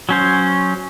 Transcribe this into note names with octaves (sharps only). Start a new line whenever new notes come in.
F#3 C#4 C5